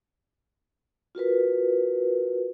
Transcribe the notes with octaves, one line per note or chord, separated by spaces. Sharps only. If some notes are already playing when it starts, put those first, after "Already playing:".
F4 F#4 A#4 B4